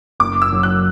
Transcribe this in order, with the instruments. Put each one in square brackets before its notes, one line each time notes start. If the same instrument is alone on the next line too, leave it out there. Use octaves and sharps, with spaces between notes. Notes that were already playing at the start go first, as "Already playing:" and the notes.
[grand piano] F#1 [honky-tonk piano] D6
[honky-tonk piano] E6
[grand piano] F#2 F#3
[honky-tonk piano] F#6